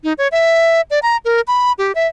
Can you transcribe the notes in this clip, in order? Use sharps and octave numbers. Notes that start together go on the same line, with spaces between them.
D#4
C#5
E5
D5
A#5
A#4
B5
G4
E5